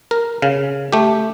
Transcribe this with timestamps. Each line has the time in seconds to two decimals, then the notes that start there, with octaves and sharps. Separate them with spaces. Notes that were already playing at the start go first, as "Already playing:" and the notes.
0.11 A#4
0.42 C#3 F5
0.92 A3 G4